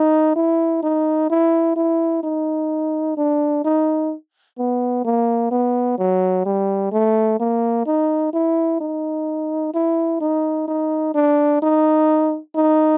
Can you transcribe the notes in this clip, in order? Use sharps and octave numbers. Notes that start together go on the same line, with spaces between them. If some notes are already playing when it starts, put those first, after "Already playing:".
Already playing: D#4
E4
D#4
E4
E4
D#4
D4
D#4
B3
A#3
B3
F#3
G3
A3
A#3
D#4
E4
D#4
E4
D#4
D#4
D4
D#4
D#4